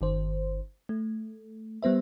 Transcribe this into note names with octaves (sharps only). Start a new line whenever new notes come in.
G1 D#3 C5
A3
G3 B3 C5 E5